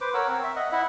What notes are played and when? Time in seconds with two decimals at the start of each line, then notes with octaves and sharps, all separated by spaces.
0.01 B4 C5 D6
0.14 A#4 C#5 F#5 E6
0.27 C4
0.44 E5
0.56 D#5 F#5
0.72 E4 E5 F#5